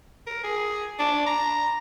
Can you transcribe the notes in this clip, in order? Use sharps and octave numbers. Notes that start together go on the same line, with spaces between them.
A#4
G#4
D4
A#5